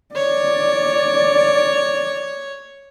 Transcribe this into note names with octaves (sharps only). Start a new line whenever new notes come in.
C#5 D5